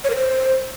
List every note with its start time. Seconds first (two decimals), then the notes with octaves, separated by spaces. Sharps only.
0.04 C#5
0.10 A#4
0.16 C5